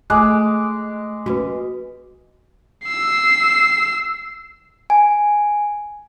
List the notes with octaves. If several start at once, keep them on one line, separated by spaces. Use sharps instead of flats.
G#3 A3 D6 F#6
A#3 C#4 F#4 B4
E6 C7
G#5